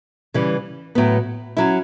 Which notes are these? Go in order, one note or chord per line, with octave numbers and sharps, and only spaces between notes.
C#3 E3 G3
A2 F#3 B3
F#3 C#4 E4